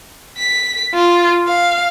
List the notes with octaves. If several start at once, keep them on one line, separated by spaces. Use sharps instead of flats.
B6
F4
F5